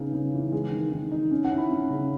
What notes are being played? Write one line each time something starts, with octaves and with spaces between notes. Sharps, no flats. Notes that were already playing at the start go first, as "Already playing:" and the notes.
Already playing: C#3 B3 D#4
C#3
E3
G#3
D#3
D#3
D#4
C#4
F#5
E4
B5
C#4
C#3